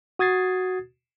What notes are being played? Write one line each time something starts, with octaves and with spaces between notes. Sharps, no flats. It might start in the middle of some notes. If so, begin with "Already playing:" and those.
F#4 D#6 G#6 A6 C7